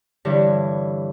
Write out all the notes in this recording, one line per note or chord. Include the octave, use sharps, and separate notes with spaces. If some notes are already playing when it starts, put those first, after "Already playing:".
G2 D3 E3 E4 C#5